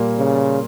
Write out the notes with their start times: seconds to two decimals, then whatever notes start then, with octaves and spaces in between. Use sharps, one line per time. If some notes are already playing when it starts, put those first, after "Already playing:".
Already playing: A#2 G3 A#3
0.19 C#3